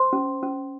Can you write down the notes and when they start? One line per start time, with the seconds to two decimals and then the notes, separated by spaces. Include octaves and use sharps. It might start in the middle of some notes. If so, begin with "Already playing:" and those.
Already playing: C5 C6
0.13 C#4
0.43 C#4